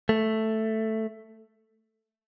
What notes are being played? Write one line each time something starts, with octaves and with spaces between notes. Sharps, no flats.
A3